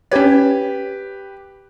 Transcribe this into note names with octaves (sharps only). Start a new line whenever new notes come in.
C#4 G4 B4 C#5